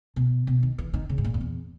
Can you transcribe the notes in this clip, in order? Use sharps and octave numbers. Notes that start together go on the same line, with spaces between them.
B2
B2
D#3
E3
D#3
C#3
G#2
A#2
F#2
E2